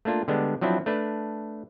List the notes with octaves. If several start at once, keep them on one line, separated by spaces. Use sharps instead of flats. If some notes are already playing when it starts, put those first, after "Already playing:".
A3 A#3 D4 F4
D3 G3 G#3 B3 D4
F3 F#3 C4 D4 E4
A3 D4 B4